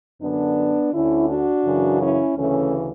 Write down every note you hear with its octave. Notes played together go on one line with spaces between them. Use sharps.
F#2 D3 B3 D4
D2 D3 C#4 E4
D4 F#4
F#2 C#3 E3
C#4 E4
D2 C#3 E3 A3 C#4